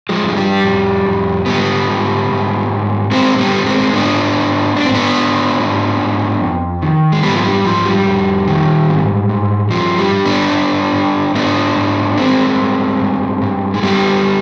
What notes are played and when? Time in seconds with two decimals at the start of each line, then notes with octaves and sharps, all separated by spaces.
0.09 F3 G#3
0.23 G2
0.28 G#3
0.37 G3
0.64 F2
1.06 F2
1.46 G#2 G3 B3
1.88 G#2
2.29 G#2
2.70 G#2
3.11 G2 G#3 C4
3.38 G3 B3
3.53 G2
3.66 G#3 C4
3.93 G#2 B3 D4
4.35 G#2
4.76 G#2 D4
4.85 C4
4.94 B3 D4
5.17 G#2
5.59 G#2
5.99 G#2
6.41 F2
6.82 D#3
7.12 G#3
7.23 G#2 G3 B3
7.36 F3
7.44 G3
7.64 G#2 F3
7.85 G3
8.06 F2
8.47 D#3
8.88 G#2
9.29 G#2
9.71 G2 F3
9.98 G3
10.12 G2
10.25 B3 D4
10.53 G2
10.95 G2
11.35 G#2 B3 D4
11.76 G#2
12.17 G2 G#3 C4
12.59 G2
13.01 G2
13.42 G2
13.74 G#3
13.83 G2 G3 B3